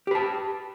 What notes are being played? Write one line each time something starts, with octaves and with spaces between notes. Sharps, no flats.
G4 B4 A5